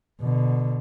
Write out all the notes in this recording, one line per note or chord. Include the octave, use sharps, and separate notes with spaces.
B2 D3